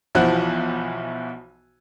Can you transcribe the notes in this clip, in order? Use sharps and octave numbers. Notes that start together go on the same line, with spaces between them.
B1 E3 F3 F#4 C5 F#6